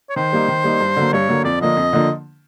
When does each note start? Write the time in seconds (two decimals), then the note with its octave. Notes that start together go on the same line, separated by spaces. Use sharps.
0.10 C#5
0.16 D#3 C5
0.33 G3 A#3 D#4
0.48 D#3
0.64 G3 A#3 D#4
0.81 G2
0.96 D3 F#3 A#3
1.13 G2 C#5
1.28 D3 F#3 A#3
1.44 F2 D5
1.61 D3 F3 A#3 D4 D#5
1.77 F2
1.93 D3 F3 A#3 D4